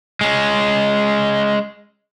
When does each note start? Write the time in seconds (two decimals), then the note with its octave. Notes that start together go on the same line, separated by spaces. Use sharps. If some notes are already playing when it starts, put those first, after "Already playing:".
0.21 G#3 C#4